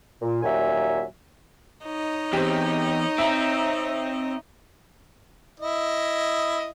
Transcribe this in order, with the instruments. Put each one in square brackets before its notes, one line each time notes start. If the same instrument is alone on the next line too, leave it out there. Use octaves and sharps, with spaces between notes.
[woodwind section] A#2
D#2 A#2 F#3 E5 G#5
[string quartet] D#4 C#5 D#5
[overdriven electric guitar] E2 [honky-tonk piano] C4 G4
[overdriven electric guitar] C4 [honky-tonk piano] E5 A#5
[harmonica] E4 D#5